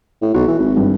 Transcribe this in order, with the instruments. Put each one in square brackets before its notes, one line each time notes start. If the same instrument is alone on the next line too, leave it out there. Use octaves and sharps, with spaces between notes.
[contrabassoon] A2
[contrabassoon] B1 [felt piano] F#4
[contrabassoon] E3
G#1
[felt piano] G2